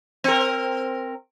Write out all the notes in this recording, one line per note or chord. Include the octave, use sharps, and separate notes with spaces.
C4 A#4